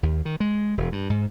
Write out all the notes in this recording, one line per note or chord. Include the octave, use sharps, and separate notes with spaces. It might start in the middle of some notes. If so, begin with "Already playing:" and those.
D#2
D#3
G#3
E1
G2
G#2